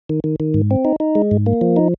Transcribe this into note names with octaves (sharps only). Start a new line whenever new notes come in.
D#3
D#3
D#3
G#2
C4
D#4
D#4
G#3
G#2
A#3
F3
D#4